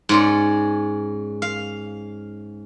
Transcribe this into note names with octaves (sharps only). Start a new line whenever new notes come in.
G#2 C#4 D5
F5